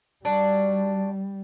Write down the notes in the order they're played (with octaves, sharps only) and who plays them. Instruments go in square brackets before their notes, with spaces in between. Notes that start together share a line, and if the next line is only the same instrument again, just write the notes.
[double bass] G3 [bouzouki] D4 F#4